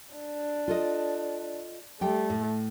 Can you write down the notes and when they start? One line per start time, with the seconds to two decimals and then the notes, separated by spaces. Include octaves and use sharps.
0.15 D4
0.68 F4 A4 D#5
2.01 G3 A3 G5
2.30 A2